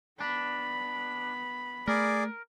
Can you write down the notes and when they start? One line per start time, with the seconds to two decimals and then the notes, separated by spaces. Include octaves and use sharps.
0.21 B3 D4 B5
1.88 A3 G#4 A#4 D5